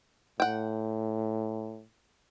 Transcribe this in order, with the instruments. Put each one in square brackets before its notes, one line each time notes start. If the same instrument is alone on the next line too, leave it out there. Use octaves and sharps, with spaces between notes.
[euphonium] A2 [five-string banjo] F#5 G5